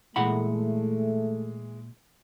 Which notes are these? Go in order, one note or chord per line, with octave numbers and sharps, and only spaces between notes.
A#2 E3 G#3 A3 F#5 B5